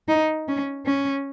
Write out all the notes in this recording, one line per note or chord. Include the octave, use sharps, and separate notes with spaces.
D#4
C#4
C#4